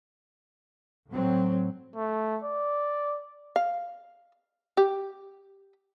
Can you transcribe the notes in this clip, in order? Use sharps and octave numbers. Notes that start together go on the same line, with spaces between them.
A2 F#3 C4
A3
D5
F5
G4